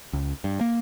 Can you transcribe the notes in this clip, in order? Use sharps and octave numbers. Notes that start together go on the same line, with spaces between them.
C#2
G2
A#3